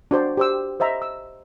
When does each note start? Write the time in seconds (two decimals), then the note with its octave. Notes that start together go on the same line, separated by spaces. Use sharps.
0.11 D4 F#4 C5 D5
0.37 G4 C5 E6
0.80 C5 D#5 E5 A#5
1.02 E6